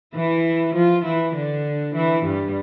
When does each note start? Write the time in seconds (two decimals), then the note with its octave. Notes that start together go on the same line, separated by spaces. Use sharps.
0.14 E3 E4
0.75 F3 F4
1.05 E3 E4
1.35 D3 D4
1.95 E3 E4
2.25 G2 G3